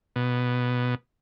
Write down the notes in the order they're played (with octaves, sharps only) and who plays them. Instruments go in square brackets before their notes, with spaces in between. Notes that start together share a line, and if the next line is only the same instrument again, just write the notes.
[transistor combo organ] B2